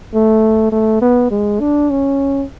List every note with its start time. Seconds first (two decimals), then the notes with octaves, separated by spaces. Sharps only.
0.14 A3
0.72 A3
1.01 B3
1.30 G#3
1.60 D4
1.90 C#4